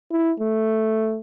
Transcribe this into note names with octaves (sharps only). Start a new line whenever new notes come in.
E4
A3